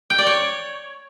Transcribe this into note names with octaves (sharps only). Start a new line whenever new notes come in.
G5
D5
C#5